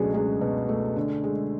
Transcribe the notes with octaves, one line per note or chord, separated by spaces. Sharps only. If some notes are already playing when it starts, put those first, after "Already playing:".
Already playing: C#2 B2 F#3 G#3 A3 D4 F#4 G#4
C#2 G#3 G#4
B2
A3
D3
G#3